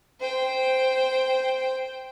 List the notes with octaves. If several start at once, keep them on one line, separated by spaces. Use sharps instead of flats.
C5 G5